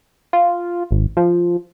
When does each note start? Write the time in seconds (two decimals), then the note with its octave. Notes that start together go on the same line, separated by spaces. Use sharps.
0.33 F4
0.91 G#1
1.17 F3